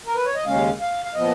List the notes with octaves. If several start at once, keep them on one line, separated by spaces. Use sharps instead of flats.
A#4
B4
C#5
D#5
D#2 C#3 G#3 C#4 F5
F5
F5
A#2 F3 B3 D#5